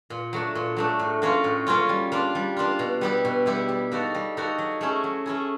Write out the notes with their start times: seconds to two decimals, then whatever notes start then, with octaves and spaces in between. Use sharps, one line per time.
0.10 A#2
0.33 F#3 A3 D4
0.55 A#2
0.76 F#3 A3 D4
0.99 A2
1.22 F#3 A#3 C#4 F4
1.44 A2
1.67 F#3 A#3 C#4 F4
1.89 G3
2.12 A#3 D4 F4
2.35 G3
2.57 A#3 D4 F4
2.79 B2
3.01 G3 B3 E4 G4
3.25 B2
3.46 G3 B3 E4 G4
3.68 G3
3.91 A#3 D#4 F#4 A4
4.15 G3
4.37 A#3 D#4 F#4 A4
4.59 F#3
4.81 A3 C#4 E4 G#4
5.04 F#3
5.26 A3 C#4 E4 G#4